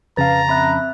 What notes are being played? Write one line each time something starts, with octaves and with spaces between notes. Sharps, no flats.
F2 C#3 B4 F5 A5 A#5 A6
C4 E5 B5 F#6